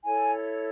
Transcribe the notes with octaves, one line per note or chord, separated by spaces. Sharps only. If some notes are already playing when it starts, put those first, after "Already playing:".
E4 A4 C#5 G#5